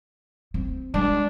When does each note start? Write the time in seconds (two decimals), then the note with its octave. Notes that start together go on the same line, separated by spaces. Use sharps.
0.54 C4
0.94 G#3 D4